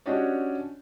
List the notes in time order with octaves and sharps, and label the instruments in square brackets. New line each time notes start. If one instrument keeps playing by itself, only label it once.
[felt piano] C#4 D4 F#4 G4 C#5 D#5